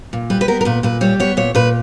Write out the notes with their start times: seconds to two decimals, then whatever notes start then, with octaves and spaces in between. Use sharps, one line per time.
0.13 A#2
0.30 G3 B4
0.41 B4
0.48 B3 A#4
0.61 A#4
0.65 A#2 B4
0.83 A#2 B4
1.01 G3 C#5
1.20 B3 C#5
1.37 A#2 C#5
1.55 A#2 B4